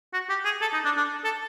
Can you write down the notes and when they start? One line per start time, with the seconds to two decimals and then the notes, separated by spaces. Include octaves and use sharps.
0.13 F#4
0.29 G4
0.45 G#4
0.61 A4
0.73 D#4
0.85 D4
0.97 D4
1.24 A4